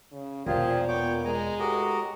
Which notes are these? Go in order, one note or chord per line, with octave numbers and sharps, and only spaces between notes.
C#3
E1 A#2 F3 F4 G4 G#4
B3 C#5 G5 D6
G#3 G#5 A#5
A2 B3 F#4 G4 A#4 D#5